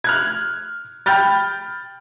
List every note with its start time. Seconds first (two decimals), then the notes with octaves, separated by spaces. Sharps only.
0.04 F6 F#6 G#6
1.06 G5 B5 F6 G6 A6